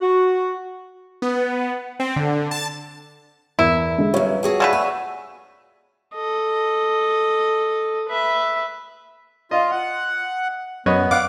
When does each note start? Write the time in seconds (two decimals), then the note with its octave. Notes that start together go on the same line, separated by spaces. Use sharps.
0.01 F#4
1.22 B3
2.00 C4
2.16 D3
2.51 A5
3.59 E2 E4 A#4
3.98 D3 G#3
4.14 F#2 C#3 G3 F4 B4 C#5
4.43 F#4 G#4 F#5 G5 A5 E6
4.60 C#3 A3 B4 D5 F5 F#5
4.73 C#5 G#5 C#6 E6
6.15 A4 D#5
8.09 B4 E5
9.51 F4 D#5
9.71 F#5
10.86 F#2 B3 B4 C#5 D#5
11.11 F5 F#5 D6